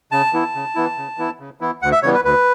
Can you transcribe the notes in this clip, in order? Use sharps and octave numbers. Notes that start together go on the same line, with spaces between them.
C#3 A5
E3 B3 E4
C#3
E3 B3 E4
C#3
E3 B3 E4
C#3
E3 B3 E4
D2 F#5
E5
C#3 E3 G3 B3 C#5
B4
D2 B4